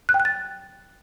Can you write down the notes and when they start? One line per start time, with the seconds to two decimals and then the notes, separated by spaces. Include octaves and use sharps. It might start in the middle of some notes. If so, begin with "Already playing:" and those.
0.09 F#6
0.14 G5
0.20 F#6
0.25 A6